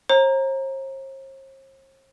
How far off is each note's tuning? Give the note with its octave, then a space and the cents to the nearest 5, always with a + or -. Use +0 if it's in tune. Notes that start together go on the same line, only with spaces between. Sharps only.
C5 +45 A#5 +0